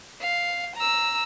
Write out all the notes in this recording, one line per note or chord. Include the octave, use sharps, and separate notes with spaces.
F5
A#5 E6